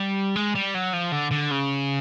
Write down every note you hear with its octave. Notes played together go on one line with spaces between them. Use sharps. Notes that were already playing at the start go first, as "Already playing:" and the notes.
Already playing: G3
G#3
G3
F#3
F3
D3
D3
C#3